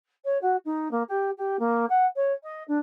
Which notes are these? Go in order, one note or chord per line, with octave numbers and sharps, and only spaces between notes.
C#5
F#4
D#4
A#3
G4
G4
A#3
F#5
C#5
D#5
D4